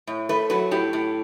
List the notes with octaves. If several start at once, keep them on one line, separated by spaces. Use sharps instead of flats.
A2
A3 B4
F#3 B4
A2 G4
A2